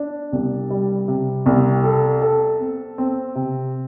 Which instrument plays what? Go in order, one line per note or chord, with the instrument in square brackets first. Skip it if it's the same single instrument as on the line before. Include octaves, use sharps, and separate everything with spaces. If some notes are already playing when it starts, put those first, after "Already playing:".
Already playing: [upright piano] D4
C2
G3
C3
C2
A4
A4
C4
C4
C3